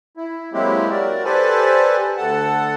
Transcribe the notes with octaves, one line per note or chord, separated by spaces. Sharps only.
E4
F#3 G#3 A#3 C4 E4 G4
F#4 A#4 D5
G4 A4 B4 C5 D5 G#5
D2 A4 F#5 A5